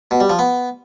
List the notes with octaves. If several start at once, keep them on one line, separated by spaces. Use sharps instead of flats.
B2
G3
F3
B3